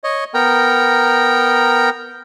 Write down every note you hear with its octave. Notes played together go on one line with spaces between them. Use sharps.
C#5 D#5
B3 A#4 G5 A#5